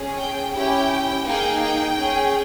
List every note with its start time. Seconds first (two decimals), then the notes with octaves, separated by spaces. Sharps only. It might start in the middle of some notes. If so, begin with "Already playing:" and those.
Already playing: C#4 G#4
0.17 G5
0.53 C#4 E4 G4 G5
1.26 A#3 D#4 G#4 G5
1.61 G5
1.97 C#4 G#4